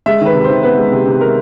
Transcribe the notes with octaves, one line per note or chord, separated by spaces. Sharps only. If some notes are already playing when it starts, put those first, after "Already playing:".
G#3 E5
D#3 B4
C3
C5
D#3
B3 B4
G#3
C3
C3
G#3 A#4